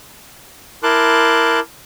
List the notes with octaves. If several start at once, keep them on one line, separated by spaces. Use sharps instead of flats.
E4 A#4 A5 C6 D6 F#6